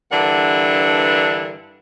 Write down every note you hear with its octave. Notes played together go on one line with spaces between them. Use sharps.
G2 D3 E3 D4 A#4 F#5